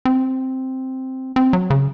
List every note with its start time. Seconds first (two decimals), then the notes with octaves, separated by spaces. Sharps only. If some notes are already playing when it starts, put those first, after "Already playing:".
0.05 C4
1.36 C4
1.53 F#3
1.70 C#3